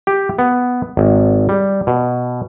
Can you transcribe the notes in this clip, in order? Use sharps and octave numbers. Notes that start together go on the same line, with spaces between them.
G4
B3
G#1
G3
B2